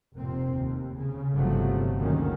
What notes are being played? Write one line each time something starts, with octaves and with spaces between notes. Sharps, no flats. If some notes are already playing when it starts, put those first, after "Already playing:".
F1 A#2 C4
D#2
C#3
G1 G2 C3 F3 F#3 A3
F#1 D2 A#2 D#3 C#4